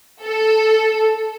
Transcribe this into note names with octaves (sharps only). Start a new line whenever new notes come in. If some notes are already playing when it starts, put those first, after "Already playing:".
A4